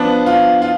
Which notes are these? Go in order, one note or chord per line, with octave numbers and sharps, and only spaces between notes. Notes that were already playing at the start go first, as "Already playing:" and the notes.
Already playing: F3 B3 D4
F4
F4